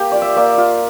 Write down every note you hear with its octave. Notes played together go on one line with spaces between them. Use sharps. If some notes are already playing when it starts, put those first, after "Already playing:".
Already playing: A#3 G4
F4 D5
E5
A#3 D5
F4